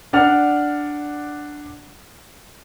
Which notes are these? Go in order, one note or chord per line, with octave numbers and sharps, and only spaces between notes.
D4 D5 F#5 F6 F7